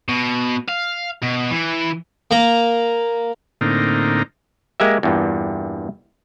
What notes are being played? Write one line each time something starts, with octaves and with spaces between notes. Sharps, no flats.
B2
F5
B2
E3
A#3 A#5
A2 D3 A#3 C4 D#4
G#3 A#3 G4 E5
E2 G2 A#2